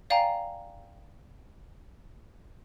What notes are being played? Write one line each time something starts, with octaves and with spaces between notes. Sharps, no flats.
D5 F5 G5 G#5 A#5